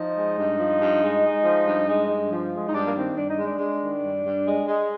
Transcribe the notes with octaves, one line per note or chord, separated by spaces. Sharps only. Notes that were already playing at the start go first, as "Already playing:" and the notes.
Already playing: F3 D#4
G#3
G2
F3
G2
G#3
G#3
F3
G2
G#3
G2
F3
G#3
D#4
G2 D4
A#3
D#3 C4
G2 D4
D#4
G#3
D4
G#3
D#3
G2
G2
G#3
G#3